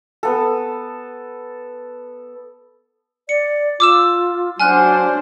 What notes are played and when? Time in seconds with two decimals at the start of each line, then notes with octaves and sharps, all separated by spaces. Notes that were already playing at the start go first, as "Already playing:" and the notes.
0.23 B3 A4
3.29 D5 C#7
3.80 F4 D6 E6 E7
4.60 F#3 D4 C5 F#5 G#5 F6 F#6